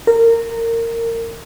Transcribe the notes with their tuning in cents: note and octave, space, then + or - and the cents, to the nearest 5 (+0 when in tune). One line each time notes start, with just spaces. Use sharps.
A#4 -20